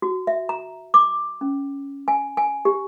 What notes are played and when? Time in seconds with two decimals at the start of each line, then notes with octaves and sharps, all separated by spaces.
0.02 F#4
0.27 E5
0.49 A#5
0.94 D6
1.41 C#4
2.08 G#5
2.37 G#5
2.65 G4